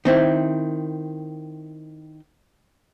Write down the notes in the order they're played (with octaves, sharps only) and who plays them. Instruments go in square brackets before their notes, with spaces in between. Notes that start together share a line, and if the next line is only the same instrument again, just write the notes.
[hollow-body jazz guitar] D#3 C4 E4